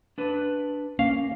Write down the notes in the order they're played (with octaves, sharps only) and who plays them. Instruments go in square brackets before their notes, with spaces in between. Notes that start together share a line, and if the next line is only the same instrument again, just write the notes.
[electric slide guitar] D4 B4
[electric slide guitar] A#3 [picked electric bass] C#4 [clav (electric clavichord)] F5